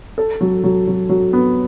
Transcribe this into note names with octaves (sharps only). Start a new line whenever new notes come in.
A4
F#3
F#3
F#3
F#3
B3